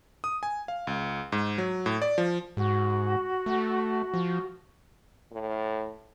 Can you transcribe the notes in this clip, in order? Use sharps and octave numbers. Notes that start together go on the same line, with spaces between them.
D#6
G#5
F5
C#2
G#2
F#3
A2
D5
F3
G#2 F#4
A3
F3
A2